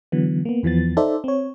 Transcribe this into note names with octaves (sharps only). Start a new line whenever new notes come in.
D3 E3 F#3 B3
A#3 B3
E2 E3 F3 B3 A6
D#4 A4 C5 D5 E5
C4 C#5